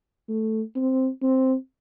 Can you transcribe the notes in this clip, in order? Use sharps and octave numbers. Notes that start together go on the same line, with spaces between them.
A3
C4
C4